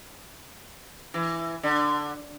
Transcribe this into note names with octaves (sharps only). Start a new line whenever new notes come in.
E3
D3